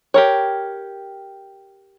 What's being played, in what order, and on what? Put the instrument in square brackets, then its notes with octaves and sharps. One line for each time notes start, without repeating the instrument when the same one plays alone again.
[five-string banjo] G4 A#4 C#5